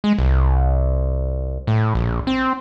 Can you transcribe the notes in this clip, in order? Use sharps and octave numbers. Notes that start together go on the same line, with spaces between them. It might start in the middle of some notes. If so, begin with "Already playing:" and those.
G#3
C2
A2
A#1
C4